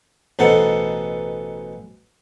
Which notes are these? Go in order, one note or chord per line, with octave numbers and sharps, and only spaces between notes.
A1 B2 D#4 A4 C5 F#5